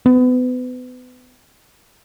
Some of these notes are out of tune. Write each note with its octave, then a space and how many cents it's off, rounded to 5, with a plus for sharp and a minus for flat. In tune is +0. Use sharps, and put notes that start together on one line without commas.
B3 +30